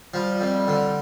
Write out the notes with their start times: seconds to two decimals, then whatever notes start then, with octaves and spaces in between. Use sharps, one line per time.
0.14 F3 G3
0.41 F2
0.68 D3